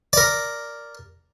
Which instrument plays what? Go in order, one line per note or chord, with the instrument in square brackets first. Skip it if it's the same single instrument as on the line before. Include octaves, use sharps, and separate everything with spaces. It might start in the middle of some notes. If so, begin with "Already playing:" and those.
[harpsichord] A#4 D5